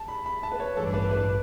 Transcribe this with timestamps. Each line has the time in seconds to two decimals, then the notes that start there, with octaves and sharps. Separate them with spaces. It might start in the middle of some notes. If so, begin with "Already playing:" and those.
Already playing: A5
0.08 B5
0.26 B5
0.43 A5
0.52 B4
0.60 C#5
0.76 A1 G2 E3 A3 D4 A4
0.94 B4
1.11 B4